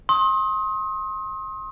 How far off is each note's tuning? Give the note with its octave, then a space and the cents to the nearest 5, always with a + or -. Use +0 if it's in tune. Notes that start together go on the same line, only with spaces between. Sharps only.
C6 +35 D#6 +30